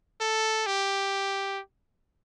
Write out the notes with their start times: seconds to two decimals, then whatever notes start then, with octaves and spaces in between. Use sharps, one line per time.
0.21 A4
0.66 G4